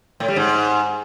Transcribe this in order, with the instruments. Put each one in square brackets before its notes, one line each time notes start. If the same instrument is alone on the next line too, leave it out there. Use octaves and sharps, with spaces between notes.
[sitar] A2
G3
G#2